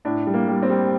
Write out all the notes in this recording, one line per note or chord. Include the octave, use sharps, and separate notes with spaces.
A2 D4
G3
A#3
G3
C4
G3